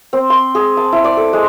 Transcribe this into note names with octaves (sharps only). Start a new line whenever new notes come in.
C4
C6
G#4
A5
E4
D5
A4
G#3